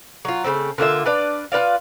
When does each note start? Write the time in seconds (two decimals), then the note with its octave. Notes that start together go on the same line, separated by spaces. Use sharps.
0.25 F#3 F4
0.44 C#3 G3 A3 C4
0.78 D3 A#3 F4 E5
1.06 D4 B4 D5 F5
1.52 F4 B4 D5 F5